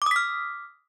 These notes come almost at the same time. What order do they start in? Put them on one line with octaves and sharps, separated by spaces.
D6 D#6 B6 F6